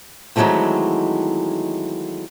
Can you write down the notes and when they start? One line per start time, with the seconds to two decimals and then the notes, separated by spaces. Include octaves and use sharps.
0.36 D#3 E3 F#3 G#3 A3 C4